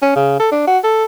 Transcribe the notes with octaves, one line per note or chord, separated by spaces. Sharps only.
C#4
C#3
A4
D4
F#4
A4